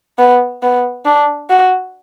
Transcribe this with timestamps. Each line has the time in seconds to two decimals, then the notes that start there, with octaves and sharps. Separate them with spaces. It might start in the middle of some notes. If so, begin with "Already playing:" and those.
0.18 B3
0.63 B3
1.06 D4
1.49 F#4